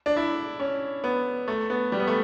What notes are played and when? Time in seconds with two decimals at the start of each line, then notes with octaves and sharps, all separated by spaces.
0.06 D4
0.17 E4
0.60 C#4
1.04 B3
1.48 A3
1.70 B3
1.92 G3
2.00 B3
2.07 A3